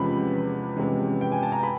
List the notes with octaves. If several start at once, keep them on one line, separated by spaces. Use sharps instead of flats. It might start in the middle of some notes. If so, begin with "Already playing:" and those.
Already playing: E2 C3 F3 G#3 C#4 B5
E2 C3 F3 G#3 C#4
G5
G#5
A5
A#5
B5